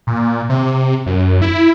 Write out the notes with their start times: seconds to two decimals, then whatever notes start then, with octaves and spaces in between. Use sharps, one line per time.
0.07 A#2
0.49 C3
1.06 F#2
1.42 E4